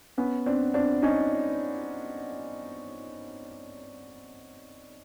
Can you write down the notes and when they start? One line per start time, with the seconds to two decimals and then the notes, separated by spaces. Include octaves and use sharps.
0.18 B3 C#4
0.46 C4 D4
0.74 C4 D4
1.02 C#4 D#4